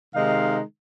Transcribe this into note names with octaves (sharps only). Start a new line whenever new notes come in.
C3 D#3 G#3 D#4 F5